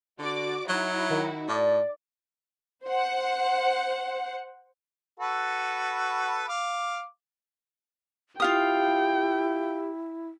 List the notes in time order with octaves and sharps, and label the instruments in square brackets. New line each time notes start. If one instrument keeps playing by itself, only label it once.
[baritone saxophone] D3 [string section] F#4 D5 D6
[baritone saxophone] F#3 [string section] D#4 E4 F#4
[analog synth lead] D#3
[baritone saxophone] A2 [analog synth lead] D5
[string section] C5 F#5
[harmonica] F#4 A4 B4
F5 D6
[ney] E4 [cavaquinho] F4 F5 D#6 [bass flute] G4 [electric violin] G5